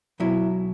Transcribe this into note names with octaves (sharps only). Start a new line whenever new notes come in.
B1 B2 F#3 E4